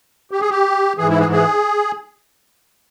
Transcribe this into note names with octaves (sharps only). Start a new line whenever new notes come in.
G4
G#4
G4
G#2 E3 G#4
E4
G#4
G#4